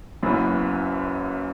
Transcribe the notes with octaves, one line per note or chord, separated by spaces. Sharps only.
F#1 F#2 E3 B3 E4